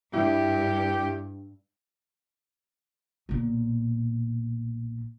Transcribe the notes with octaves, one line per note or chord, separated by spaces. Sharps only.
G2 E4 G4
B1 A#2